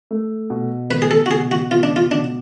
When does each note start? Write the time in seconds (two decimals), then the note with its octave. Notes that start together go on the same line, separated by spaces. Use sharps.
0.11 A3
0.50 B2
0.90 B3 B4
1.02 G#4
1.11 A4
1.26 F#4
1.31 B2 G#4
1.51 F#4
1.71 B3 F4
1.83 D4
1.96 F4
2.11 B2 D4